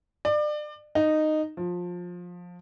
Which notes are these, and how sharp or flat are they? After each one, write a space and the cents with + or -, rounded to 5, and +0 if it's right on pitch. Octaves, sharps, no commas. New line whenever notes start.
D5 +30
D#4 -10
F3 +20